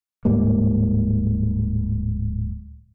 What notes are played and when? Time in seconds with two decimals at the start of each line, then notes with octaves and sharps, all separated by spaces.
0.25 D1 G#2 G3 A#3